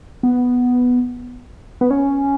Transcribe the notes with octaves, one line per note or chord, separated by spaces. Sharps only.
B3
B3
C#4